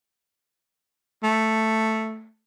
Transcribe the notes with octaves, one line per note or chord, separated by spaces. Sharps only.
A3